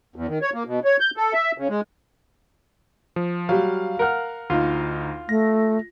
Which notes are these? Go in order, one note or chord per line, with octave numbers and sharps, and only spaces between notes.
E2
D#3
C#5
A#3
B2
C#5
G6
A4
E5
C#3
G#3
F3
F#3 G3 F5
A#4 F#5 F6
D2 D#4 F4
A3 A#6